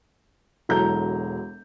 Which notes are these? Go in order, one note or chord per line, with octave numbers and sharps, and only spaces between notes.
E1 F#3 E4 A4 A#5 G6